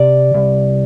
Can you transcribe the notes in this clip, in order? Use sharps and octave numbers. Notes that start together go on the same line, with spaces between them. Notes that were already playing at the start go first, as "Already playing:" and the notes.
Already playing: C3 D5
C2